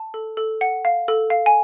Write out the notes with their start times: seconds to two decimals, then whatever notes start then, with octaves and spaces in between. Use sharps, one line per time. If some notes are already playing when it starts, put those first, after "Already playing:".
Already playing: A5
0.14 A4
0.37 A4
0.61 F#5
0.85 F5
1.08 A4
1.30 F5
1.46 G#5